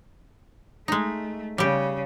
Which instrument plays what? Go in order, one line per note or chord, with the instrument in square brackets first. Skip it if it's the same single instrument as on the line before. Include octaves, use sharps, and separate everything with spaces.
[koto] G#3 D#4 [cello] A3
[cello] C#3 [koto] G3 G4